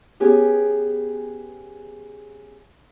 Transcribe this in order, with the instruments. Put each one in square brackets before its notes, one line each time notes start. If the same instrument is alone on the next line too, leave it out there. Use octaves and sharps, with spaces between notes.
[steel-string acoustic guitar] B3 C#4 G4 G#4